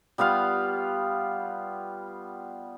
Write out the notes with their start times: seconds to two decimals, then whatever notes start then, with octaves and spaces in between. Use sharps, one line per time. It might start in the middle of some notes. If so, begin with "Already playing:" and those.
0.18 G3 B3 F4 F5